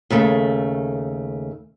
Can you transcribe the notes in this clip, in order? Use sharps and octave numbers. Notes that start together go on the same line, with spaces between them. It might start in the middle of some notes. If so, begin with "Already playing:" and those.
D#2 C#3 A3